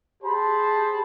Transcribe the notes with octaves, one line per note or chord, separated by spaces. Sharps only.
G4 G#4 C5 A5 B5